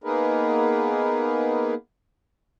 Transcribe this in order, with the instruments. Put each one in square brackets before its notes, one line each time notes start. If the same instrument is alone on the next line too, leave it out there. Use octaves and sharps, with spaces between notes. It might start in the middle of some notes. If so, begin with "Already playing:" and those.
[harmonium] A#3 B3 D#4 G#4 A#4 B4